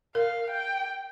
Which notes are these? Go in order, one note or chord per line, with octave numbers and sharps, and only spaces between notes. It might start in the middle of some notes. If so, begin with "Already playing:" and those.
A#4 F5
G5